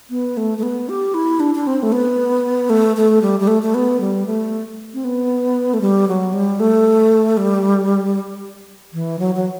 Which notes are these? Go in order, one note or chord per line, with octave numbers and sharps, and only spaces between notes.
B3
A3
A3
B3
G4
E4
D4
D4
C4
A3
B3
A3
A3
G3
G3
A3
A3
B3
G3
A3
C4
B3
A3
G3
F#3
G3
A3
G3
E3
F#3
F#3